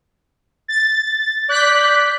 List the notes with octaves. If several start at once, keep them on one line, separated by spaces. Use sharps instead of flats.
A6
D5 F#6 G6 B6